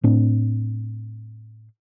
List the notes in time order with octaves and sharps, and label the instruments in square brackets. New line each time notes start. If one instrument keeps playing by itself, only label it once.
[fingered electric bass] A2 C4 D4